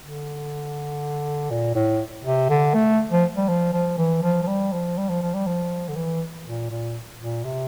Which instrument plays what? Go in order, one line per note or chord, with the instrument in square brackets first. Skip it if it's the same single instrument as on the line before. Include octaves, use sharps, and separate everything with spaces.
[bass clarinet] D3
A#2
A2
C3
D3
A3
F3
G3
F3
F3
E3
F3
F3
G3
F3
G3
F3
F3
G3
F3
D3
E3
A#2
A#2
A#2
C3